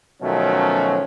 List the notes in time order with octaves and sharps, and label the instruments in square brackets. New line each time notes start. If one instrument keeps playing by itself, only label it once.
[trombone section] B2 D#3 F3 F#3 A3 C#4